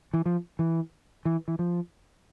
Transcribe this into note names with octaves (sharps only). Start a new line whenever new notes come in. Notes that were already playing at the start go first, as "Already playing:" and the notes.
E3
F3
E3
E3
E3
F3